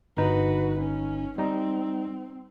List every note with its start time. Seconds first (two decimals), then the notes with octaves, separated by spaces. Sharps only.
0.17 G1 D#4 F#4 B4
0.79 C#4
1.38 G3 C4 D#4